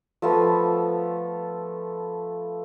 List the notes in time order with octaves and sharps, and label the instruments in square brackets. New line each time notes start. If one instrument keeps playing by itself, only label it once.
[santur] F3 A3 B3